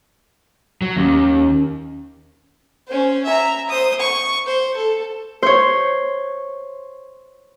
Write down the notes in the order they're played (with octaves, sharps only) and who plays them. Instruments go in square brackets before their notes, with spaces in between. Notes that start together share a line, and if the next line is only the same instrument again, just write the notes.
[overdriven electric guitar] F#3
[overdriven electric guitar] D#2 [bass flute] C#4
[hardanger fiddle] C#4 C5
E5 A#5
C5 D#6
C#6
C5
A4
[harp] C5 C#5